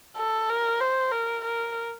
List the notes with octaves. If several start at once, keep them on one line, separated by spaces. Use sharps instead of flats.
A4
A#4
C5
A#4
A#4